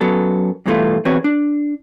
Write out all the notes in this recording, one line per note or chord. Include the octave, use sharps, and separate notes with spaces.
F#2 F#3 B3 A4
G2 B2 E3 G#3 A3 F4
E2 C4 F#4 B4 C#5
D4